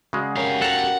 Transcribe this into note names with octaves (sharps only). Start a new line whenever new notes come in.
C#3 G#3 F#4 D5
B3 C#4 G4 A#4 F5
A4 F#5 A#5